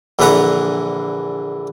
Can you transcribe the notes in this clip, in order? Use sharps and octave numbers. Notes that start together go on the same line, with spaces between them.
A#1 D3 E3 B4 F#5 A#5